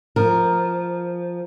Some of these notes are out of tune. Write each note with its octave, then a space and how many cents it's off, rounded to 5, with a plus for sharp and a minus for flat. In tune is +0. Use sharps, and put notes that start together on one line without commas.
F3 +0 A#4 +0